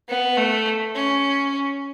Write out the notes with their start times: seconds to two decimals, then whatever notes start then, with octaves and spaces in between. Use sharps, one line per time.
0.09 B3
0.37 A3
0.95 C#4